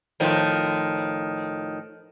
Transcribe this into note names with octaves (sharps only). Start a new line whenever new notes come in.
A2 D#3 F3